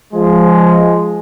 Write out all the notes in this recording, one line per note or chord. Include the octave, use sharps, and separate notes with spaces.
F3 G#3